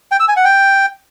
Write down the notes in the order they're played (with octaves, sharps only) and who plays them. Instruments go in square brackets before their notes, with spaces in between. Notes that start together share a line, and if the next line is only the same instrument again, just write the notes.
[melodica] G5
E6
G#5
F#5
G5